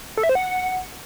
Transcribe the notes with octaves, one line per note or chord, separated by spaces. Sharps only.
A4
E5
C5
F#5